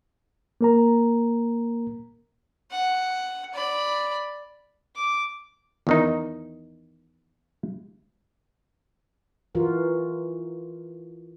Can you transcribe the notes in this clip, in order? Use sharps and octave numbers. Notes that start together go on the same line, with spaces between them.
A#3 A#4 A#5
F#5
D5 B5
D6
E2 D#3 D#4
E3 F4 F#4 A#4